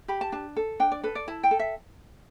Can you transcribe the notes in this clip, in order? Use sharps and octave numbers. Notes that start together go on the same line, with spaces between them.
G4 B5
A5
D4 A5
A4
D4 G5
D5
A4 B4
D5
E4 A5
G5
A4
E5